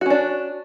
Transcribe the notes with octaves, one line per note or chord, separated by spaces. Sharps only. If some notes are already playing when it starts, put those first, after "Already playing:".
C#4 D4 F#4